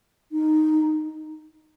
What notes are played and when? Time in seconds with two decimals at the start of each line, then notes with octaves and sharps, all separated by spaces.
0.32 D#4